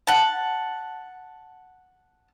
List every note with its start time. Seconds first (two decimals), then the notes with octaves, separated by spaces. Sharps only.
0.07 F#5 A5